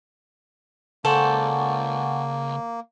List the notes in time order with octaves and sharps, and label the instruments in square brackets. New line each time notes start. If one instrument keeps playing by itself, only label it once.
[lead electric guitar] C#2 [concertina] A#3 [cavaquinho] A4 C5 D5 [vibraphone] F#5 G#5 C#6